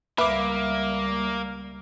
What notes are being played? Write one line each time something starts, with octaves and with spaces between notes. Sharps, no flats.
C#2 G3 A#3 B4 E5 D6